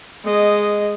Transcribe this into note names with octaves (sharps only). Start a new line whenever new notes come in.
G#3 D#5